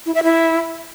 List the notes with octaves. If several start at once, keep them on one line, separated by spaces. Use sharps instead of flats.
E4
E5
E4